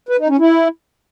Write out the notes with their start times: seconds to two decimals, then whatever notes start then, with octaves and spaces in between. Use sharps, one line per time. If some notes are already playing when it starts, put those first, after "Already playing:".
0.09 B4
0.19 D#4
0.29 C#4
0.39 E4